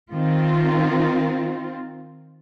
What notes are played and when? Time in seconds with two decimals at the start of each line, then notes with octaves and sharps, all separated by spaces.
0.12 D#3 C4 F4